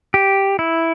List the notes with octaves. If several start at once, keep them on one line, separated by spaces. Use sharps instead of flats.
G4
E4